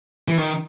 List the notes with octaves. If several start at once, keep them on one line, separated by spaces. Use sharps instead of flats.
E3
D#3